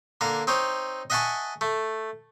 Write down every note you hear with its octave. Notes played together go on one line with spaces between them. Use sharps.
D3 A#3 A#4
C4 D#4 C#5
D#5 E5 F#5 G#5 A5 C#6
A3